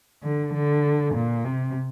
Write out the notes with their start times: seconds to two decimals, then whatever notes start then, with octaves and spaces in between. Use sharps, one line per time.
0.23 D3
0.53 D3
1.15 A#2
1.44 C3